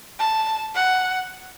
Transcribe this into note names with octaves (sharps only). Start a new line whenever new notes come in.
A5
F#5